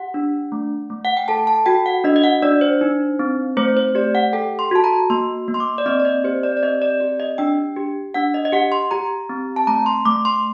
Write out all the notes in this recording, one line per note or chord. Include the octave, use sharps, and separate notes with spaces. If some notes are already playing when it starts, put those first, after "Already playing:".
Already playing: G4 F#5
D4
A3
A3
F#5
G5
A4 A5
A5
F#4 G5
F#5
D4 D#5
D#5
F#5
D4 D5
C5
D#4
C4
A3 C5
C5
G4 D5
F#5
A4 G5
C6
F#4 A5
A#5
A#3 C6
A#3
C6
D6
D5
C4 D#5
D5
D#5
G4 C5
D5
D5
C4 D#5
D5
G4 D5
D#5
D4 G5
G4
D4 F#5
D#5
D#5
G4 F#5
C6
G4 A#5
C4
A5
A3 A#5
C6
A3 D6
C6